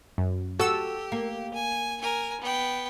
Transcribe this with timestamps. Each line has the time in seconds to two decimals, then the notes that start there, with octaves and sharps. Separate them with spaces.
0.18 F#2
0.60 F#4 G4 A4 E6
1.12 A#3
1.54 G#5
2.01 A#4 G#5
2.41 B3 G5